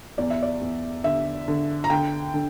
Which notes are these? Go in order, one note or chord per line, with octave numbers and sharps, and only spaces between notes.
E2 D5
E5
D5
E2
D3 E5
D3
A#5
D3 G5
D3